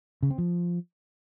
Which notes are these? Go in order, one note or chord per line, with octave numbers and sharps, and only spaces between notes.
C#3
C4
F3